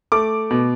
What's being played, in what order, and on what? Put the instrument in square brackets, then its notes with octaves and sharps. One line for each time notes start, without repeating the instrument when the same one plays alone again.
[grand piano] A3 D6
B2